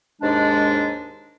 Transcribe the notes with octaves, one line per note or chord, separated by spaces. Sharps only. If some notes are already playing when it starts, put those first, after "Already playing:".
D#2 G#2 G#3 D4